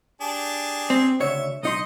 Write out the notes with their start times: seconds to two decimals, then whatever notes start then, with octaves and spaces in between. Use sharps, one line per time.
0.21 D4 G4 G#4
0.90 C4
1.20 D2 C#3 C#5 E5
1.63 B1 D#4 D#5 C6